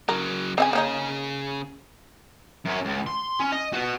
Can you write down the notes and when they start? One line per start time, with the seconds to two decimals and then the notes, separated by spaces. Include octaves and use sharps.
0.09 C#3 F#3 A#4
0.58 C#3 C4 G#4 E5 G#5
0.73 A#3 C#4 D#4
2.65 F#2 C#4
2.85 C#2
3.07 C6
3.40 C#4
3.52 D#5
3.73 F#4 B4